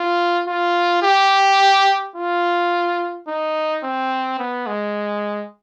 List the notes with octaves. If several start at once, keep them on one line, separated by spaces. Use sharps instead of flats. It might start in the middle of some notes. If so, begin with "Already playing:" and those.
Already playing: F4
F4
G4
F4
D#4
C4
B3
G#3